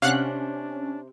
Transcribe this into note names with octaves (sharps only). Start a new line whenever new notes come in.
C3 C#4 D4 F5 F#5 F#6